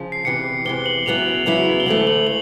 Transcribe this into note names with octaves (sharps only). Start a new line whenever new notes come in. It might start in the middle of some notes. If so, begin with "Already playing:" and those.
Already playing: C#3 F3
C7
E2 C3 E3 C#7
E2 C3 E3 G7
F#7
E2 C#3 F#3 B3 E4 F7
E2 C#3 F#3 B3 E4
G7
D2 C#3 E3 A3 F#7
F#7
F#7